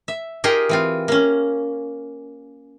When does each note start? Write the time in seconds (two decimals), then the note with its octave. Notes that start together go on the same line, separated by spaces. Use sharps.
0.08 E5
0.44 D#4 F4 G4 G#4 A#4 D#5
0.69 E3 C4 F4
1.08 A#3 C#4